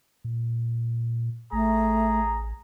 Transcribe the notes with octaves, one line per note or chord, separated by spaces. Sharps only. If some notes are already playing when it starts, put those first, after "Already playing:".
A#2
A1 A3 G#4 A#5